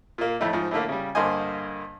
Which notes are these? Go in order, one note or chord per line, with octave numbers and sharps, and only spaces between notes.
A#2 A#3
F2 A2 A3 D#4
G#2 F3
A2 D3 A3 A#3
C#3 G3
G2 D3 A#3 C5 D#5 G#5